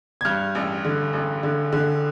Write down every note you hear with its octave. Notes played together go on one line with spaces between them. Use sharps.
G#6
G2 F6 G6
A1
D3
A1
D3
D3